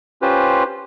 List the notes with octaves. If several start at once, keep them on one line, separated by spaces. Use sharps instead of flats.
C#4 F4 G4 B4 C5